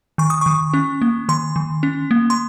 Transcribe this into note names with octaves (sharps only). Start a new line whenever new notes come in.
D#3 C#6
D#6
D#3 C#6
C#4
A#3
D#3 C6
D#3
C#4
A#3
C6